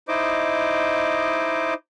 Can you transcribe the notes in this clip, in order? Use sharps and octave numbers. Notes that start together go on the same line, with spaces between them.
D#4 E4 C5 D#5 D6